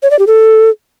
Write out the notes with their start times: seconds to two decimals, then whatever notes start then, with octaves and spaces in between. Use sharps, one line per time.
0.03 C#5
0.11 D5
0.19 G4
0.27 A4